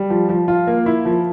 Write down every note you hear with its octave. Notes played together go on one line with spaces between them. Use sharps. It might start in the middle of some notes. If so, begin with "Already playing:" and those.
Already playing: G3
F3
F3
F4
A#3
E4
F3